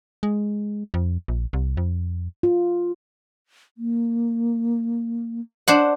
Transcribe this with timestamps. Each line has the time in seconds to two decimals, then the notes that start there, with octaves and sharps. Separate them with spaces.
0.23 G#3
0.94 F2
1.28 A#1
1.53 C2
1.77 F2
2.43 F4
3.78 A#3
5.68 D4 C5 F#5